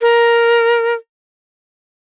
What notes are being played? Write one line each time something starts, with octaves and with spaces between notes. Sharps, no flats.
A#4